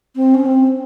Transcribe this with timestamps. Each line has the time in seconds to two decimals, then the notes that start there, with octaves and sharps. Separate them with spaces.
0.16 C4
0.35 C#4
0.46 C4